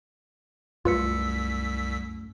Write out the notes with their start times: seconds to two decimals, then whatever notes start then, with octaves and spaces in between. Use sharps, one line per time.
0.85 C2 F#2 A3 F4 B4 E6 B6 C#7